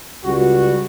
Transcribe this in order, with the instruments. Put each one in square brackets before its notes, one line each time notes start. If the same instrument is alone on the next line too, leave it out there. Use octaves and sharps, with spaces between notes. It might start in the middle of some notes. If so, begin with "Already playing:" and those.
[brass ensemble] C#2 G3 F#4